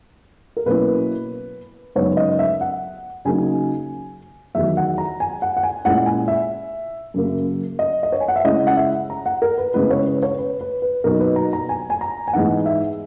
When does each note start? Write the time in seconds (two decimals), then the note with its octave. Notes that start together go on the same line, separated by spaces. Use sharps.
0.57 A#4
0.66 B2 F#3 A#3 C#4 E4 B4
1.95 F#2 C#3 G#3 B3 D#4 C#5
2.17 D#5
2.39 E5
2.61 F#5
3.25 C#3 F#3 A#3 D#4 G#5
4.55 E2 D#3 F#3 E5
4.77 F#5
4.98 A#5
5.20 G#5
5.42 F#5
5.57 F#5
5.63 G#5
5.85 A#2 G#3 C#4 E4 F#5
6.06 G#5
6.28 E5
7.14 F#2 C#3 F#3 A#3
7.79 D#5
8.03 D#5
8.12 C#5
8.20 G#5
8.28 F#5
8.36 E5
8.45 C#3 G#3 C#4 E4 D#5
8.67 F#5
8.77 E5
9.10 A#5
9.26 F#5
9.42 A#4
9.58 B4
9.74 C#3 G#3 B3 E4 B4
9.91 C#5
10.06 B4
10.23 C#5
10.39 B4
10.61 B4
10.82 B4
11.04 B2 F#3 A#3 D#4 A#4
11.20 B4
11.36 A#5
11.53 A#5
11.69 G#5
11.90 G#5
12.01 A#5
12.28 G#5
12.33 G#2 E3 B3 D#4 F#5
12.66 E5